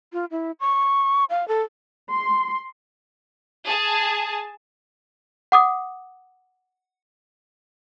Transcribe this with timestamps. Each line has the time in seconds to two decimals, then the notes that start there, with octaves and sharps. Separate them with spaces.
0.13 F4
0.31 E4
0.60 C#6
1.30 F5
1.48 A4
2.12 C6
3.66 G#4 A5
5.52 F#5 D6 D#6